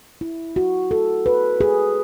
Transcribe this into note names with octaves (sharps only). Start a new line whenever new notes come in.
E4
F#4
A4
B4
G#4